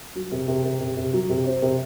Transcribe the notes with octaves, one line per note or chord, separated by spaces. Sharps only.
F#3
C3
C3
C3
C3
C3
F#3
C3
C4
C3